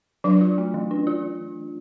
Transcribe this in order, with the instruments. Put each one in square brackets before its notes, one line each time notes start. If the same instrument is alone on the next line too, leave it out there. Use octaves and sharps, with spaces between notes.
[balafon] F#3 [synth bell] D4
[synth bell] F4
A3
E3
D4
F4